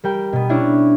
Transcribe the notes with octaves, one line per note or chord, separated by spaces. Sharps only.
G3 A#4 G5
B2 B3
C#4 D4 E4